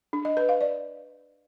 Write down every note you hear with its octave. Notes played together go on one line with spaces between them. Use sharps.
D4
D#5
B4
F5
D5